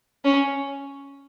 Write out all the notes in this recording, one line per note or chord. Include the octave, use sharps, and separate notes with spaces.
C#4